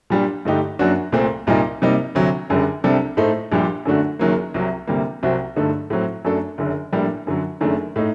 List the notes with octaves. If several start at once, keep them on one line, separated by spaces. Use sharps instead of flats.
A#2 G3 D4 G4
G2 D3 A3 D#4 G4
F#2 F#3 A#3 D4 F#4
C2 A#2 A3 C4
C2 A#2 G3 A#3 D#4
C3 G3 A#3 D#4
D2 C3 F#3
F#1 F#2 D3 G3
C2 C3 G3 D4 A4
A2 A3 D#4 A4 C5
A#1 A#2 G3 D4 G4
F#2 D3 A3 D4 F#4
F#1 F#2 D#3 F#3 A#3
C2 C3 F#3
D2 C3 G3 A#3
C2 C3 F#3 C4 F#4
G2 D3 A3 D#4 A4
A2 F#3 C4
F#2 F#3 A3 D4 A4
F#1 F#2 D3
A#1 A2 G3 A#3 D4
F#2 D3 F#3
F#1 F#2 D#3 A3 D4
A2 A3 D#4